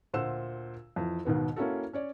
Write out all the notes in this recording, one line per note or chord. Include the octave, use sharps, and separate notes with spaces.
D2 A#2 C5 F#5 E6 E7
F2 E3
D#2 G#2 B2 D#3 B3
A#3 C#4 E4 F#4 A4
C#4 C#5 D5